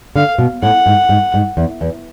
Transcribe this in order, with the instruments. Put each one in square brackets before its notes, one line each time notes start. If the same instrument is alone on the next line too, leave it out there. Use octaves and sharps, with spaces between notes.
[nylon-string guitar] D3 [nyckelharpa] F5
[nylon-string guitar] B2
[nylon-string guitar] A2 [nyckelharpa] F#5
[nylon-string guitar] G#2
G#2
G#2
E2
E2